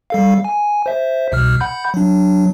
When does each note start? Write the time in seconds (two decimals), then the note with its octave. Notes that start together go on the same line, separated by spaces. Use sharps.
0.10 G3 A4 F5
0.44 G#5
0.86 C5 E5
1.32 C2 B2 F6
1.60 F#5 B5 G6
1.94 F#3 D4